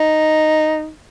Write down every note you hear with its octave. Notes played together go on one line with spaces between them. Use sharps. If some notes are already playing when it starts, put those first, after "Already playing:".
Already playing: D#4